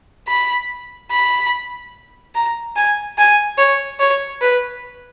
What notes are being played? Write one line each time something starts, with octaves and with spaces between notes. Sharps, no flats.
B5
B5
A#5
G#5
G#5
C#5
C#5
B4